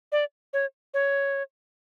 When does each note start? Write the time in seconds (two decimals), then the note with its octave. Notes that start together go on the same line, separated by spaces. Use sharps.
0.12 D5
0.53 C#5
0.94 C#5